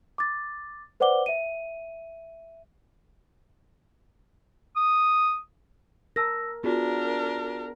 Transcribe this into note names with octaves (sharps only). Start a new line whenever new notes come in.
D6 A6
B4 C5 D5 F#5 D6 G7
E5 D#7
D#6
A#4 A5 E6 A#6
B3 D4 F4 F#4 G#4 A#4